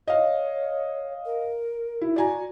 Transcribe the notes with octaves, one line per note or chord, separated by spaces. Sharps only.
C#5 D#5 F5
A#4
E4
F#4 D5 G#5 A#5